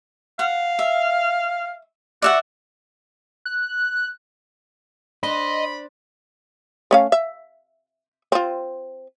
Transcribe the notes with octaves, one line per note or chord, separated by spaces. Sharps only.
F5 F#5
E5
F#4 D5 E5 F#5
F#6
D4 C5 D#5 B5
A3 C#4 F5
E5
C4 F4